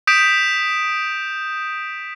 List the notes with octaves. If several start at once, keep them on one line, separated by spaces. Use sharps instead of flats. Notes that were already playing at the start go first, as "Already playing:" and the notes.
D#6 G6 B6 D7 E7